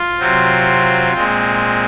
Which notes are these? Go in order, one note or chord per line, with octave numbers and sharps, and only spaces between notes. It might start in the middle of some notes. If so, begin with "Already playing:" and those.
Already playing: F4
C3 F#3 C4
A#2 G#3 C4